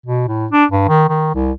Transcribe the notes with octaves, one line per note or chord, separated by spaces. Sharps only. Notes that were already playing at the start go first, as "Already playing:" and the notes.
B2
A2
D4
G2
D#3
D#3
C2